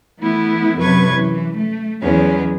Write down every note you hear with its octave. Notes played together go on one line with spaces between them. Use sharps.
E3 A3 B3 E4
F#2 C3 F#3 B4 C#6 G#6
E3
A3
E2 F#3 G#3 B3 C#4